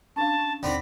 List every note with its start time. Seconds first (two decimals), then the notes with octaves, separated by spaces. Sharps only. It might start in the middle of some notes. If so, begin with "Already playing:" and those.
0.16 C#4 D4 F5 A5
0.38 C#4
0.63 D#2 D3 C4 D#4 B5